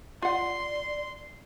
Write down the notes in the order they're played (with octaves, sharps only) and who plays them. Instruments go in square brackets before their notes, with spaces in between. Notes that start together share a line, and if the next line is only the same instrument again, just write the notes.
[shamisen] F4 F#5 [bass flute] D5 [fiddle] C6